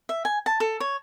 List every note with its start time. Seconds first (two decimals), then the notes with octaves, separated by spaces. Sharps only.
0.09 E5
0.25 G#5
0.46 A5
0.60 A4
0.80 C#5